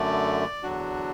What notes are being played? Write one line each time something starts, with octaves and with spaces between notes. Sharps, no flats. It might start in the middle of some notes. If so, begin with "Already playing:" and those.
Already playing: F#2 D3 A3 D5
E2 D3 F#3 D4 F#4